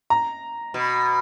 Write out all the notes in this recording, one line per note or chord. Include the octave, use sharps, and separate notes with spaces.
A#5
B2